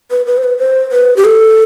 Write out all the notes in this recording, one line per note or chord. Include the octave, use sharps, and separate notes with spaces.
B4
B4
C5
B4
C5
B4
G4
A4